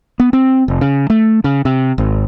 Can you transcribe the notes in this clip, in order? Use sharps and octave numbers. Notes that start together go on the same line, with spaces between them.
B3
C4
F1
C#3
A3
C#3
C3
G#1